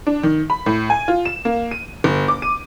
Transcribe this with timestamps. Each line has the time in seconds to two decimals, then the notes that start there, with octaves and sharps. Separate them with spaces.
0.07 D4
0.23 D#3
0.50 B5
0.66 A2
0.90 G#5
1.08 F4
1.25 E7
1.45 A#3
1.71 D#7
2.04 G1
2.28 D6
2.42 D#7